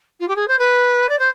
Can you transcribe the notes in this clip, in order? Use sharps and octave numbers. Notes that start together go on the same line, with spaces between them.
F4
G4
G#4
C5
B4
D5
C5